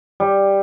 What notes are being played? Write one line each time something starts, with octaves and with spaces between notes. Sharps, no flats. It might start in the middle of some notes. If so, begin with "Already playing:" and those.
G3